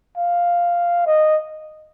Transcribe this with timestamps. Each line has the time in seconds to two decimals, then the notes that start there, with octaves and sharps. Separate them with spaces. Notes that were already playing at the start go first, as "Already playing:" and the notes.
0.17 F5
1.06 D#5